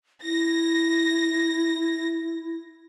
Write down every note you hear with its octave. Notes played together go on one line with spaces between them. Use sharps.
E4 A#6